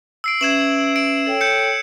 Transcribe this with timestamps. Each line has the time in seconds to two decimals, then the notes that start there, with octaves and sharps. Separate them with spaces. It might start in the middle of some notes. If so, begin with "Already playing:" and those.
0.24 E6 C7 D7
0.41 C#4 B4 E5 G#6 E7 F#7
0.96 D7
1.26 A4 C#5 G5
1.41 G6 C#7